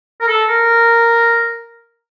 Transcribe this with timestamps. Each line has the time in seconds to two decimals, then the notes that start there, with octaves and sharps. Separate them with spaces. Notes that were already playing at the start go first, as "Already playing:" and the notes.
0.21 A#4
0.28 A4
0.49 A#4